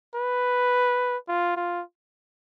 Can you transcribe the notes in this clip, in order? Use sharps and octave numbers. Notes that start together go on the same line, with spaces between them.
B4
F4
F4